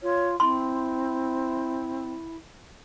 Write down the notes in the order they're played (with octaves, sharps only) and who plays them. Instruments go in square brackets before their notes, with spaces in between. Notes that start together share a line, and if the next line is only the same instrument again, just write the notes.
[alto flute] F4 [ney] C#5
[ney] C4 [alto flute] E4 [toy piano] C6